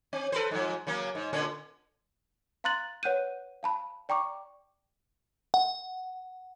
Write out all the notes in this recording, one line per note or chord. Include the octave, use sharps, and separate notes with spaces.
C4
A4 B4 C5
G#2 F3
C#3 F#3 A#3
G#2
A#2 D3 C#4
F5 A#5 C6 F#6 A6 F#7
B4 C#5 F#5 F#6 G6 D#7
F5 A5 B5
D5 G5 A#5 C#6 D6
F#5